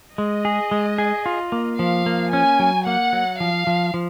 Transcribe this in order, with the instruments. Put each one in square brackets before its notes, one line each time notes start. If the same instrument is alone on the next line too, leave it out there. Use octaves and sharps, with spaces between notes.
[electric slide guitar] G#3 [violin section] D#5
[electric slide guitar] G#4
G#3
G#4
F4
A#3
[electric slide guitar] F3 [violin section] F5
[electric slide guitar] A#3
[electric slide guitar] C#4 [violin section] G#5
[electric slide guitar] F#3
[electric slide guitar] A#3 [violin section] F#5
[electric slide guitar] F#3
[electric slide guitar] F3 [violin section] F5
[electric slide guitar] F3
F3